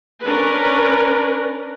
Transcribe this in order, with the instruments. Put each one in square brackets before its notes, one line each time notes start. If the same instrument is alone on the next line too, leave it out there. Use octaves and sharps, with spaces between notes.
[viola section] C#4 D4 A#4 B4